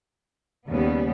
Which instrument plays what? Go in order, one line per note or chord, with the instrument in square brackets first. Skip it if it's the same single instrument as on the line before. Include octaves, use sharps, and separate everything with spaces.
[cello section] D#2 C#3 G3 B3